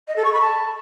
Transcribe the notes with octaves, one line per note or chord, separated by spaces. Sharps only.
D#5
A4
C#6
B5
A5